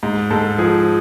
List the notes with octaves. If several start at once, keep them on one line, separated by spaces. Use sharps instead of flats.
G#2
G#2 A4
F3 G#4